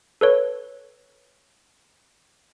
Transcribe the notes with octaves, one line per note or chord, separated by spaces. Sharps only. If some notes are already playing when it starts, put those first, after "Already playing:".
A4 B4 C#5